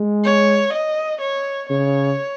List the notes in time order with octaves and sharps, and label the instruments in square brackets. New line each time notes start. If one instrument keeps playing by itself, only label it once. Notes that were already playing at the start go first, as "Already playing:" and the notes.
Already playing: [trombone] G#3
[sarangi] C#5
D#5
C#5
[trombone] C#3 [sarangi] C#5